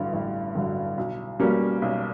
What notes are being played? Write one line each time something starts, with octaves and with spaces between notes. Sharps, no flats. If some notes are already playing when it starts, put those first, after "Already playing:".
Already playing: A1 G2 D3 F#3
A1
G2 D3 F#3
B1
B2 G3 A#3 C#4
B1